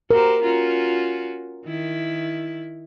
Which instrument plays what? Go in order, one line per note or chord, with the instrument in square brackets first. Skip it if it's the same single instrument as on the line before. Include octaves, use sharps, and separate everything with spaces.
[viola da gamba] F#4 G4 C5 [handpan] A#4
[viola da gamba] C#4 F4 F#4
D#3 E4